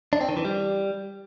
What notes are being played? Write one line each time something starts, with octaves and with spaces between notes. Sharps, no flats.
D4
C4
D#3
E3
G3